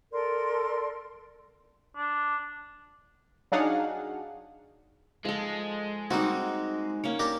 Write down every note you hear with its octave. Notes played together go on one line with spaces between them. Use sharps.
A4 A#4 D5 C6
D4
F#3 D4 D#4 G#4 F5 F#5
F3 G#3 A4
G3 A#3 C4 D#4 F#4
A#3 C#4 C#5
D4 G4 A#4